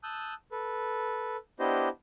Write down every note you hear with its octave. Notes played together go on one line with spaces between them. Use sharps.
A5 D#6 E6 F#6 G6
A4 B4
B3 D4 E4 G4 C5 D#5